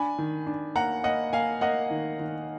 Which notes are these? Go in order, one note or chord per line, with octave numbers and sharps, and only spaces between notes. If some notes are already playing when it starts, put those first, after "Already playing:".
Already playing: D4 G#5 B5
D#3
D4
A#3 F#5 A#5
A#3 D#5 F#5
A#3 F5 G#5
A#3 D#5 F#5
D#3
D#3